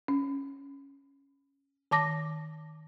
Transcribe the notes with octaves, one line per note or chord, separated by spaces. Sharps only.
C#4
D#3 A5 D6 A#6